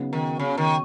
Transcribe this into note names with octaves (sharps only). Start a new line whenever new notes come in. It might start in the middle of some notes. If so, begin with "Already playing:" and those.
Already playing: C#3 F#3 B3 D#4 F#4
D#3
C#3
D#3